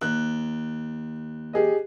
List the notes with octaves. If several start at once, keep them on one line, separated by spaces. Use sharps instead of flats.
D#2 F#6
G4 G#4 D#5